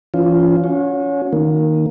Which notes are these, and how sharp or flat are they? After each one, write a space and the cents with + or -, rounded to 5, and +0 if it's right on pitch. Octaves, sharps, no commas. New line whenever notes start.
E3 +40 C#4 +35 F4 +0
C#4 +20 F#4 -35
D#3 +0 A#3 +0